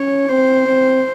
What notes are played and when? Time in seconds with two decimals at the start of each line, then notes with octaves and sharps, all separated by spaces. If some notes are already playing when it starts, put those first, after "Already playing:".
Already playing: C#4 C#5
0.29 C4 C5
0.68 C4